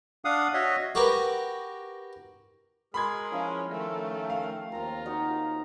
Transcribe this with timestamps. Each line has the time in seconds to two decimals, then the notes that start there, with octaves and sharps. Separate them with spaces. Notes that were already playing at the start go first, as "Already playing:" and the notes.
0.25 D4 F5 F#5 D#6
0.54 F#4 C#5 D#5 E5
0.95 F#4 G4 A#4 B4 C#6
2.94 G#3 G#4 A#4 B5 C6 G#6
3.32 F3 C#4 E4 C#5
3.71 D#3 A3 C#4 A#4
4.30 F5
4.72 D#2 C4 F4 A#4 A#5
5.06 D#4 F#4